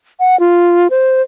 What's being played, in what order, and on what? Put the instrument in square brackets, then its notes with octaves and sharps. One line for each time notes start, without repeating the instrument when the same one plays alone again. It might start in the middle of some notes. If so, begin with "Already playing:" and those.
[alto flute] F#5
F4
C5